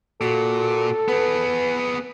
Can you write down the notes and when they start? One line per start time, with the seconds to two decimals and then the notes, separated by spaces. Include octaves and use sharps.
0.21 A#2 F#4 A4
1.08 B3 G#4 B4